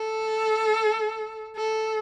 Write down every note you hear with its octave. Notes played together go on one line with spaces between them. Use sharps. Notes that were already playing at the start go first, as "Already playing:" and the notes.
Already playing: A4
A4